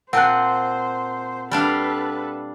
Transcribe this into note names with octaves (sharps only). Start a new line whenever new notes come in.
A#2 C4 C5 F#5 A5 F#6
G3 D4 A4 B4 F5